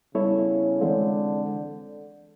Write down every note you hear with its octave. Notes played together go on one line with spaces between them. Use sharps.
C#3 G3 B3 E4 A4 C#5
D3 E3 G#3 C4